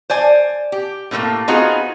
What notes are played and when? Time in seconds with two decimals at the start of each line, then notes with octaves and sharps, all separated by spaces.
0.10 C5 D5 G#5
0.72 G4
1.11 A2 C#3 E3 A3 A#3
1.48 B3 C4 D#4 F4 F#4 G#4